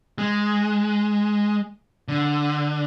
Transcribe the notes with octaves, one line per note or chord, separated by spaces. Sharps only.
G#3
D3